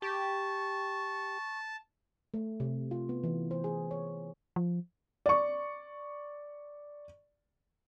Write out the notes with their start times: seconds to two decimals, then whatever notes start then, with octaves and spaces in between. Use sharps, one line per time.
0.02 G4 A5 C#6
2.34 A3
2.60 C3
2.91 F4
3.09 B3
3.24 E3
3.51 C5
3.64 G#4
3.91 C#5
4.56 F3
5.26 D5 C#6